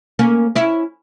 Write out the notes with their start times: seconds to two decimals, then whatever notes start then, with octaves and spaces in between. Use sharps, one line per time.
0.19 A#3 C#4
0.55 C#4 E4